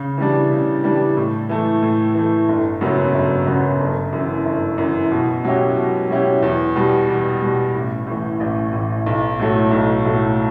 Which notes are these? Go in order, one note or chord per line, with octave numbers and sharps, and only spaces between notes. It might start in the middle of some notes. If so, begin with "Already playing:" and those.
Already playing: C#3
E3 G3 D4
C#3
E3 G3 D4
A2
E3 A3
A2
E3 A3
G1
F#2 C#3 F#3 B3
G1
F#2 C#3 F#3 B3
G1
F#2 E3
G1
F#2 E3
B2
F#3 C#4 E4 G4
B2
F#3 C#4 E4 G4
E2
B2 G3
E2
B2 G3
A1
A2 E3
A1
A2 E3
B1
A2 F#3 A3
B1
A2 F#3 A3